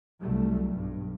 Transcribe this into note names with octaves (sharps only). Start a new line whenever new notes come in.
C2 F#3 G3 A3
B1 G2